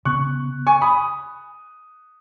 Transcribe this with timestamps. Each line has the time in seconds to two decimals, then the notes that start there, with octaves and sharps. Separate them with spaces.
0.05 C#3 B3 C#6 F#6
0.67 G#5 C#6
0.82 B5 D#6